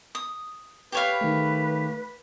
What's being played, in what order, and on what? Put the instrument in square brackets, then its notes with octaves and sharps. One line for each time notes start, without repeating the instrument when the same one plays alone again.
[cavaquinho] D#6
[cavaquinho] G4 C#5 F5 [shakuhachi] B4
[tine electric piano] D#3 A3